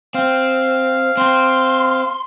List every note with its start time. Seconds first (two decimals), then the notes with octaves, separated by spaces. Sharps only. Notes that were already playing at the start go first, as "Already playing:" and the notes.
0.14 C4 F5
1.17 C4 C6